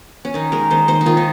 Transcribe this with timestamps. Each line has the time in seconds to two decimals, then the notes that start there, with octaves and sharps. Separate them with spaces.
0.25 C#4
0.34 D#3 D#4
0.52 G#3 A#4
0.71 D#3 C5
0.88 D#3 C5
1.01 D#4
1.06 D#3 F4
1.17 D#4